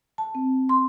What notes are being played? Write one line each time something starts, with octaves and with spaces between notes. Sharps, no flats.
A5
C4
C6